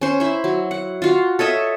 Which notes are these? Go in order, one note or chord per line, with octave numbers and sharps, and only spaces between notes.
C#4 C5
E4 C5
F#3
F#5
F4 F#4 F5
A4 C#5 D#5 E5